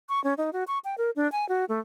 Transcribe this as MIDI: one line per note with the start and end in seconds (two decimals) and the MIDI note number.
0.09 0.22 85
0.24 0.34 61
0.38 0.50 63
0.53 0.64 66
0.67 0.78 85
0.84 0.95 79
0.98 1.11 70
1.16 1.30 62
1.32 1.47 80
1.49 1.65 66
1.69 1.80 57